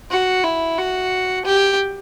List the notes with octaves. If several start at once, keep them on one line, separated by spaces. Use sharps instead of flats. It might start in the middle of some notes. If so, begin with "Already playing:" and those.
F#4
E4
F#4
G4